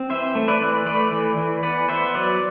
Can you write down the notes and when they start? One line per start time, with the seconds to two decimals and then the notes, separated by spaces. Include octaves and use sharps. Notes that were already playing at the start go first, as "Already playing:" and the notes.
Already playing: C4
0.10 E3 C5 E5
0.35 A3
0.48 B4 D5
0.61 E3
0.86 A3 B4 D5
1.12 E3
1.38 E3
1.63 B3 B4 D5
1.89 B3 C5 E5
2.14 F#3 B4 D5